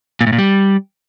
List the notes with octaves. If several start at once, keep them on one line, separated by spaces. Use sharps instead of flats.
A#2
A2
A#2
G3